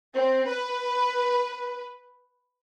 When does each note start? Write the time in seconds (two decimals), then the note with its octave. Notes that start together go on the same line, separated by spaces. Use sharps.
0.13 C4
0.47 B4